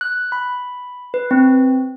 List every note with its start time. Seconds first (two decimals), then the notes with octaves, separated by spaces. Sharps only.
0.01 F#6
0.32 B5
1.14 B4
1.31 C4